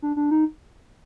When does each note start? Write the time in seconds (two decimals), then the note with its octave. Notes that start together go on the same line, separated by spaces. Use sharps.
0.02 D4
0.16 D4
0.31 D#4